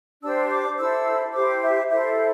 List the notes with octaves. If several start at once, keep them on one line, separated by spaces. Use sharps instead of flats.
D4 G4 C5 E6
D6
E4 A4 C5 E6
E4 G4 C5 D6
E5
E4 A4 C5 E5